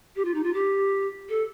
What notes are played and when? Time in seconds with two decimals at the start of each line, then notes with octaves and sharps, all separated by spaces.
0.16 G4
0.25 F4
0.34 D#4
0.43 F4
0.54 G4
1.29 A4